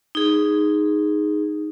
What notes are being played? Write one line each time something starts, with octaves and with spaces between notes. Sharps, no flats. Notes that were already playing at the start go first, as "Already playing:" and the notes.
D#4 G#4